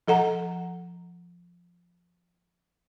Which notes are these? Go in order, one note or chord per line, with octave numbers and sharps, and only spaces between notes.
F3 A4 F#5 A#5